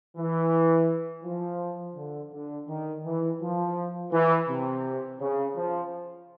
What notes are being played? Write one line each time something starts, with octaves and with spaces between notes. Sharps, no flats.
E3
F3
D3
D3
D#3
E3
F3
E3
C3
C#3
F3